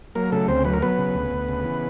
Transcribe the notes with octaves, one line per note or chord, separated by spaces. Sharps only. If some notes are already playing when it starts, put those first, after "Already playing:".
F#3 A#3 A#4
C#3 A3 A4
D2 C4 C5
F#3 B4
A#4
F#3 B3 B4
C#3
D2
D2
C#3
E3